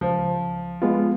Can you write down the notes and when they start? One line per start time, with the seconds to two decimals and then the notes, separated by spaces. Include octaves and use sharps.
0.01 C#2 F3
0.82 G#3 B3 F4